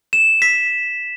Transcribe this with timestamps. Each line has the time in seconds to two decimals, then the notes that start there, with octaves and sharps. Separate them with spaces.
0.13 E7
0.42 B6